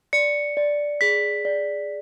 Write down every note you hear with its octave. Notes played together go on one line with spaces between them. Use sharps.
D5 C#7
D5
G#4 B6
D5